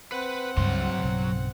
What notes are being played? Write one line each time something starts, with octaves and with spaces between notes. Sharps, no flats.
C4 B4 F#5
C#2 G2 F#3 G3 C6
B1 C#3